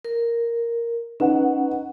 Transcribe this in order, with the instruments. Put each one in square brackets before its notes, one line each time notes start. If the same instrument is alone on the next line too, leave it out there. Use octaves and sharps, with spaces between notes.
[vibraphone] A#4
[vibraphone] C#4 [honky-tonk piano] D#4 B4 F#5